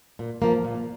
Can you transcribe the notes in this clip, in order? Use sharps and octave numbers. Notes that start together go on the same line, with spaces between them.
A#2
F3 A#3
A#2